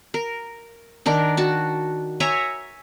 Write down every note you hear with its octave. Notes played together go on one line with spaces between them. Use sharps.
A#4
D#3 D4 A#4
F#4 A5
C#5 E5 G#5 A#5